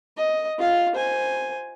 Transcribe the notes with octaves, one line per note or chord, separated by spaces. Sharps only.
D#5
F4 F5
C5 G#5